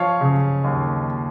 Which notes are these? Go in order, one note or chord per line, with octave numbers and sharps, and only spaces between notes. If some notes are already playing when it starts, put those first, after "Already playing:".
Already playing: F3 C#5 F5
C#3
D#2